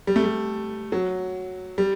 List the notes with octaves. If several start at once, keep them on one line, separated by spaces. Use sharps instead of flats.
G3
A3
G3
F#3
G3